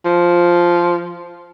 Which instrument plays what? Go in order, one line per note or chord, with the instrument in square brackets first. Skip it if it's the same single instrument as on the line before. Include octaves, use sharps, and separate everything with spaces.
[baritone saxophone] F3